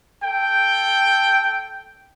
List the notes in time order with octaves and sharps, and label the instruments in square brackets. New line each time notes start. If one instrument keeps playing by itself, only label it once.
[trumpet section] A4 G5